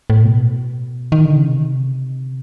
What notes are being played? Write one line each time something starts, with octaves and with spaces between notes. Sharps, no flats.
A2
B2
D#3
D3
C#3
C3